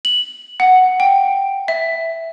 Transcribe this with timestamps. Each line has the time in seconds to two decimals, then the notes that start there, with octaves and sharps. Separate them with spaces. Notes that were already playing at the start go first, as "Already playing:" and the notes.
0.05 F#7
0.60 F#5
1.00 G5
1.68 E5